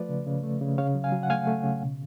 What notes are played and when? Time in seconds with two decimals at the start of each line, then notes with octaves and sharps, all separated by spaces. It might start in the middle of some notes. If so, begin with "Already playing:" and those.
Already playing: F3 A3 B4 D5
0.09 C#3
0.27 C#3
0.43 A3
0.61 C#3
0.78 C#3 C#5 F5
0.95 F#3
1.04 F5 G#5
1.12 F#3
1.23 F#5
1.30 A3 F5 G#5
1.47 A3
1.64 C#3
1.82 B2